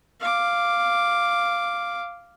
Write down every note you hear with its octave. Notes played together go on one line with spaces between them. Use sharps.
F5 D6